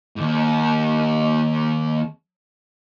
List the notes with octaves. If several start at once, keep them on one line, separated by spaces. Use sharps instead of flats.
D#2 G#2